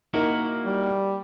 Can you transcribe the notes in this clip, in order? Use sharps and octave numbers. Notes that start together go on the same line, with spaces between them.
A#3 D#4 E4 F#4 A#4
G3